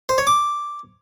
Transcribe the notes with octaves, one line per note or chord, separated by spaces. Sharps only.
C5
C#5
D6